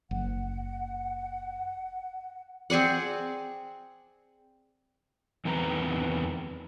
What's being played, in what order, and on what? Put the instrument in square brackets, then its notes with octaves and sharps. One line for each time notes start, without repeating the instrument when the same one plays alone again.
[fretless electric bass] F#1 [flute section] F#5
[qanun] C4 G#4 D5 F#5
[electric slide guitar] E2 D#3 C4 B4 A#5